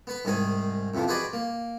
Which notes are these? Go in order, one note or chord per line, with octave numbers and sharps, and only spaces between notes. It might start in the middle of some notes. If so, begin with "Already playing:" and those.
B3 B4
C2 G#2 D#3 G#4 D#5
F2 C3 E3 F3
F#4 G#4 B4 C5 D5 D#5
A#3